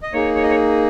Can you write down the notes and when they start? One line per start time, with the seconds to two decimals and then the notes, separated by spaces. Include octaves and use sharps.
0.03 D#5
0.13 A#3 D#4 G#4 C#5
0.36 C#5
0.43 D#5
0.50 C#5